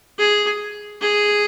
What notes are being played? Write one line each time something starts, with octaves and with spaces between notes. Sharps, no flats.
G#4
G#4